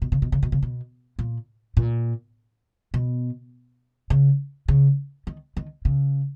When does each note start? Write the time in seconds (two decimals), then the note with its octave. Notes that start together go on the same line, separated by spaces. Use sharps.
0.02 B2
0.12 C#3
0.22 B2
0.32 C#3
0.43 B2
0.52 C#3
0.62 B2
1.19 A#2
1.77 A#2
2.94 B2
4.10 C#3
4.68 C#3
5.27 D#3
5.57 D#3
5.85 C#3